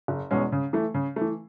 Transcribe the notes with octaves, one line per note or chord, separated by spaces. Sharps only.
F#1
E2 B2 G#3 C#4
C#3
E3 A3
C#3
E3 A3